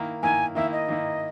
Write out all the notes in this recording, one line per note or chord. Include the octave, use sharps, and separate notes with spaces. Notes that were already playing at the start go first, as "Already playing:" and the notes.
Already playing: D#3 A#3 E4
D#3 A#3 E4 G#5
D#3 A#3 E4 E5
D#5
D#3 A#3 E4